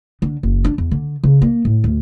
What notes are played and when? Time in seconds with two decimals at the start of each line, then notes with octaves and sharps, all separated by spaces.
0.22 D3
0.43 F#1
0.65 D4
0.78 E2
0.91 D3
1.24 C#3
1.42 A#3
1.65 A2
1.84 D2